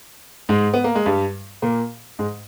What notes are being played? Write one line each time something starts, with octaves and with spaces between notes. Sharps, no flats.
G#2 G#3
B3
A#3
G#3
G2 G3
A#2 A#3
G#2 G#3